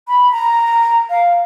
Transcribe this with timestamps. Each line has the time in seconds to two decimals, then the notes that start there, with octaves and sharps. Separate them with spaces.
0.08 B5
0.32 A#5
1.10 F5